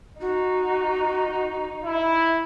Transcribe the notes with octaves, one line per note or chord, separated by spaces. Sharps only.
D#4 F#4
E4